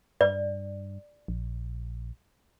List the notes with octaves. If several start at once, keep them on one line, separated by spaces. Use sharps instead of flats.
G2 D5
A#1